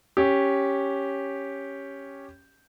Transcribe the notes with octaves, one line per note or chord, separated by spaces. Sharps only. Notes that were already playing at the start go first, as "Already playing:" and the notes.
C#4 G4